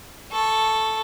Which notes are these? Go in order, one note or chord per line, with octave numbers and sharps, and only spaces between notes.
A4 C#6